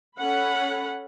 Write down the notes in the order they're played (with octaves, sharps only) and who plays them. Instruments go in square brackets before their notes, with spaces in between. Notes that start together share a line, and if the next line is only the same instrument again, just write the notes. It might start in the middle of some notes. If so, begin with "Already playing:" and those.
[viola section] C#4 A4 F#5 B5